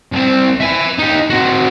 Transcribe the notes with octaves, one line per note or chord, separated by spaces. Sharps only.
C2 C4
E5 G#5
D#4 G4
C4 F#4